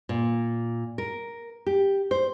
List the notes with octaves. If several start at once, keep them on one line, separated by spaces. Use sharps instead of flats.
A#2
A#4
G4
C5